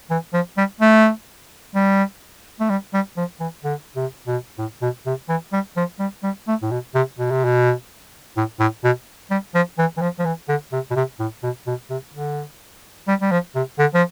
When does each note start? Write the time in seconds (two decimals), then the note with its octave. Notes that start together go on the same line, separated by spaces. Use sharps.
0.10 E3
0.34 F3
0.57 G3
0.81 A3
1.75 G3
2.60 A3
2.70 G3
2.94 G3
3.17 F3
3.40 E3
3.65 D3
3.96 C3
4.27 B2
4.59 A2
4.82 B2
5.06 C3
5.29 E3
5.53 G3
5.77 F3
6.00 G3
6.23 G3
6.48 A3
6.62 A2
6.71 B2
6.95 C3
7.18 B2
7.31 C3
7.45 B2
8.37 A2
8.60 A2
8.84 B2
9.30 G3
9.54 F3
9.78 E3
9.97 E3
10.01 F3
10.19 F3
10.25 E3
10.49 D3
10.72 C3
10.91 B2
10.96 C3
11.20 A2
11.43 B2
11.67 B2
11.90 C3
12.14 D3
13.08 G3
13.21 G3
13.31 F3
13.55 C3
13.79 D3
13.94 F3